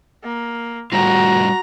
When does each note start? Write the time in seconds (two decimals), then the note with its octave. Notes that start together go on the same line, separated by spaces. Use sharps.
0.24 A#3
0.92 A2 G3 F4 F#4 A#5